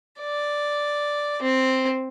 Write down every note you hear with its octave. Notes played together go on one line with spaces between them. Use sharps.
D5
C4